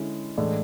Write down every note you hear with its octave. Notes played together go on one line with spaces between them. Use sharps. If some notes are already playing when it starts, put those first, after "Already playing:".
Already playing: D3 G#3 C#4 E4
A2 E3 G#3 D4